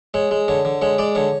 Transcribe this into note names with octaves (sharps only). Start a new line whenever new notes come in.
G#3 C#5
G#3
D3 C#5
D3
G#3 C#5
G#3 D5
D3 C#5